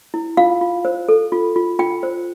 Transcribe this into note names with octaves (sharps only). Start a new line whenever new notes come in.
E4
F4 F5
F4
C5
A4
F4
F4
F4 G5
C5